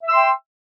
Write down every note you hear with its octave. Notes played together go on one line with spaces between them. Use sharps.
E5 G5 C6 E6